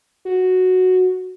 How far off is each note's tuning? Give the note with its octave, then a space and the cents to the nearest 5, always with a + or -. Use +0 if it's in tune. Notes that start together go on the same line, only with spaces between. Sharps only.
F#4 -5